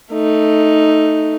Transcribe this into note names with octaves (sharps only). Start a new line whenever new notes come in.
A3 D#4